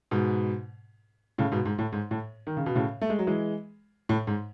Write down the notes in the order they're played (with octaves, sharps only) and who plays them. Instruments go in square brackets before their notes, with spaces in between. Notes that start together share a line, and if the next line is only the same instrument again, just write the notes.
[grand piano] G#2 B2
A2 C#3
G#2 B2
G#2
A2
G#2
A2
D#3
C#3
B2
A2 C#3
A3
G#3
F#3
E3 G#3
A2
G#2